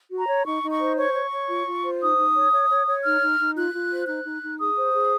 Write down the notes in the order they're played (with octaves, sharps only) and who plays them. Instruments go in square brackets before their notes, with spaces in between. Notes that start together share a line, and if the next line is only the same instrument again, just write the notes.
[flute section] F#4
A#5
C#5
D#4 C#6
D#4
C#6
C5
C#5 C#6
C#5
C#5
F4
F4
C5
D#4 D#6
D#4
C#5
C#5
C#5
C#5
D#4 F6
D#4
D#4
F4 F#6
F4
C5
D#4 F#6
D#4
D#4
G#4 D#6
C5
G#4